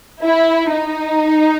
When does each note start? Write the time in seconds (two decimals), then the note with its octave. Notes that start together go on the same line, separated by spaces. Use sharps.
0.22 E4
0.72 D#4